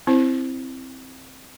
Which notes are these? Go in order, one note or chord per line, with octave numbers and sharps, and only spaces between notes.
C4 E4 C5